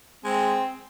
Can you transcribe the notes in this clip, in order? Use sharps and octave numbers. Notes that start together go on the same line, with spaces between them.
G#3 C4